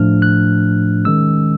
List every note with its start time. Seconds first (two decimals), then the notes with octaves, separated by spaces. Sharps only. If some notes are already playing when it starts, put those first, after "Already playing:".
Already playing: A2 F3 A3 D4 F6
0.22 F#6
1.05 D#3 G#3 C#4 E6